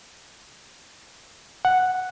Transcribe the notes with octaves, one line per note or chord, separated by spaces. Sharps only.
F#5